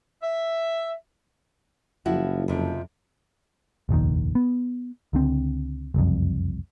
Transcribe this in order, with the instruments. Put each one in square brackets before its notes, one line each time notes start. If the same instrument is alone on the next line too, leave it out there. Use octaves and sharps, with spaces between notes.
[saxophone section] E5
[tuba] F#1 [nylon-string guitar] F3 E4 F#4
[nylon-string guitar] F2 C3 F3
[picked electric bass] F1 A#1 D#2 D#3
B3
C#2 D3 C4
F#1 C2 F2